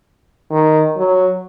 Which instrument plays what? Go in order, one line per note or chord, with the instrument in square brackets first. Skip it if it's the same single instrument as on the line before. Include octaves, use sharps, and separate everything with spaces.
[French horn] D#3
F#3